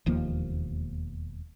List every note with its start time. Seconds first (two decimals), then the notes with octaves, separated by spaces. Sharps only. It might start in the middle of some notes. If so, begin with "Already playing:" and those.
0.06 E1 D#2 F3 A#3